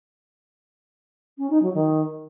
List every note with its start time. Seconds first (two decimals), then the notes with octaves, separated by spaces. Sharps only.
1.38 C#4
1.50 D#4
1.62 F#3
1.74 D#3